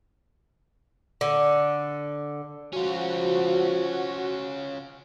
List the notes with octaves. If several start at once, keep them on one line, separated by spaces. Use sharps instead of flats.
D3
F3 C#4 F4 F#4